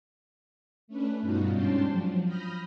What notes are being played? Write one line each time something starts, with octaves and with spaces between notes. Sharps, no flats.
A3 C#4 D4 B4
G2 B2 G3 D#4 F4 F#4
G#2 C#4 D4 G5 A5 C6
F3 F#3
B5 D#6 F6 G6 A#6